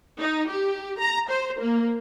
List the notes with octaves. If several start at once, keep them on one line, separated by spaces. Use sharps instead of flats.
D#4
G4
A#5
C5
A#3